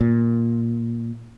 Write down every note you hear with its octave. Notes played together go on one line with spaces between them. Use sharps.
A#2